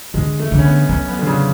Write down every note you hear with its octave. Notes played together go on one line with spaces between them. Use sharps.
D3 G#3
A3
D3
C#4
B3
F#3 C#4
B3
D3
C#3